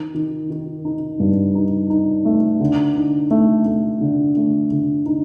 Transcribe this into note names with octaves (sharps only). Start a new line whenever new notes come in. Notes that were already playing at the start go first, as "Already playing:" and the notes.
Already playing: D#3
D#3
D#3
D#4
G2
D#4
D#4
A3
D3
D#4
A3
A3
D3
A3
D3
D#4